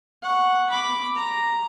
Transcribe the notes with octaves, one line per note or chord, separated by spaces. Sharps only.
F#5 C#6
B5 D6
A#5